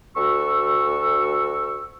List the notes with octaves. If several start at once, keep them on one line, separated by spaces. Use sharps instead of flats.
D2 F#4 C#6 E6